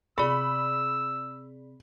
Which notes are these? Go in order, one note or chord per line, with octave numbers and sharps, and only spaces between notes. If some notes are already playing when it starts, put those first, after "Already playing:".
C3 G#4 D5 B5 E6